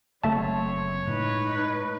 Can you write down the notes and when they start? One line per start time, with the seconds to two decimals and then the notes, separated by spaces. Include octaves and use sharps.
0.24 F#1 A3 C4 C#5 E5 A5
1.07 A2 G#3 D#4 B4